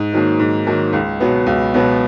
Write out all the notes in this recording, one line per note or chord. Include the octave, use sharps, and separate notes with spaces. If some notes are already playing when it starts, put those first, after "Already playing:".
Already playing: G#2
D#3 F#3 A#3
G#2
D#3 F#3 A#3
C#2
B2 F#3 B3
C#2
B2 F#3 B3